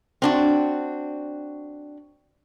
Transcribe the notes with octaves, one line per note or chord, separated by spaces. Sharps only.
C4 D4 F#4